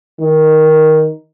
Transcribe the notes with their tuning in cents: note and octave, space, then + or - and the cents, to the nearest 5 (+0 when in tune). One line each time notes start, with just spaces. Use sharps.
D#3 +5